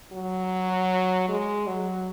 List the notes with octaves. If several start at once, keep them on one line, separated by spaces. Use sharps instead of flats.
F#3
G#3
F#3